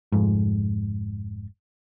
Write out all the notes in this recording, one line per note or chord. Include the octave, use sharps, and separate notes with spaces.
F1 F2 G#2